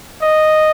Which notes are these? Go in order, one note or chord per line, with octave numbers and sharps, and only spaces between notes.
D#5